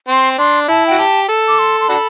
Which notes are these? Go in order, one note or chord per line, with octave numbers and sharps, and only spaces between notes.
C4 C6
D4 C6
E4 A5
F#4 G5
G4 A5
A4
D6
C6
C6
D4 F#4 A4 B5